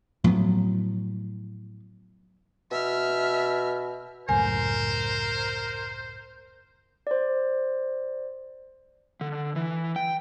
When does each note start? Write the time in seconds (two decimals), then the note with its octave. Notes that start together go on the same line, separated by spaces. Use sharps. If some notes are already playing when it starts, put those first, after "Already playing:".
0.24 A2 F3 F#3 B3
2.71 B2 E5 F6
4.29 C#2 F#2 A2 A#4 C5 G#5
7.07 C5 D5
9.21 D3
9.56 E3
9.96 G5